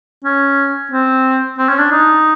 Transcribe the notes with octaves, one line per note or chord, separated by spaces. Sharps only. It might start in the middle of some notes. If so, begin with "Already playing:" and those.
C#4
C4
C4
C#4
D4
D#4